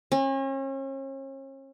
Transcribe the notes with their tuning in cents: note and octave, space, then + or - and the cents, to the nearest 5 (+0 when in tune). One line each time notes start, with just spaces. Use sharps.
C#4 -40